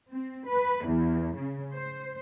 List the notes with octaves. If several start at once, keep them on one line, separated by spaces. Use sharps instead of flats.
C4
B4
E2
C#3
C5